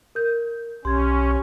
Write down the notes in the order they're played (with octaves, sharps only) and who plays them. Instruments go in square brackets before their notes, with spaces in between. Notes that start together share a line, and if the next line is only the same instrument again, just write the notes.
[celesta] A#4 G6
[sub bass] B1 [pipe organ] C#4 [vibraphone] G4 [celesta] C6 G#6